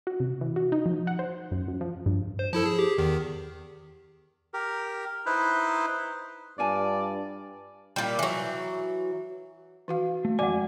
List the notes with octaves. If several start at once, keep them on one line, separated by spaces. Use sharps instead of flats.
F#4
C3
E3
F#4
D#4
F3
F#5
C5
F#2
F#2
F3
G2
C5
F3 E4 A4 A5
G#4
G4
E2 D#3
G4 A#4
D#4 E4 B4 C5
G2 F4 D5 G#5 A5
A#2 G3
E3 F#3
E3 F#4 F5
A3
F2 D#3 G#3 F#4 D5 F#5 G#5 D6